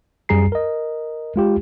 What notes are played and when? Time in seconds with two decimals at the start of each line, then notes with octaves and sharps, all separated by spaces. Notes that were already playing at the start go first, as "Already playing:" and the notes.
0.29 F#2 G3 G#4 A#5 C7
0.52 A#4 D#5
1.36 G#3 F4 G4